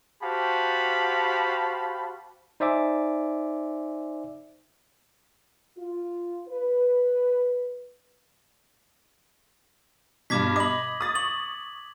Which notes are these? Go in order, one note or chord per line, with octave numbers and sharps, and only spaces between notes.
F#4 G4 C5 F5 A5 B5
D#4 C5 D5 E5 G#5 D6
F4
B4
G2 B2 D6 G#6 B6
D#5 B5 D6 F#7
D#6 A6
C#6 F#7